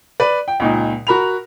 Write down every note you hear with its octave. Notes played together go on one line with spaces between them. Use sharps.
B4 D5
G5
C#2 A#2 D#4
F#4 A#4 B5 F7